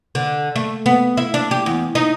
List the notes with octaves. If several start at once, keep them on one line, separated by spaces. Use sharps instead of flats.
D3
A3
B3
E4
D4
G4
E2
D#4